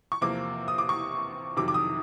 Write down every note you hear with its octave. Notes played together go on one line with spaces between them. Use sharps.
C#6
E2 C3 F3 A#3 D6
D#6
D6
C#6
F2 C3 D#3 F#3 D6
D6
D#6